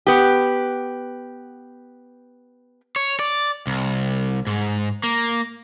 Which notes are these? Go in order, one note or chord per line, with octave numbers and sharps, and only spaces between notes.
B3 G4
C#5
D5
C2
G#2
A#3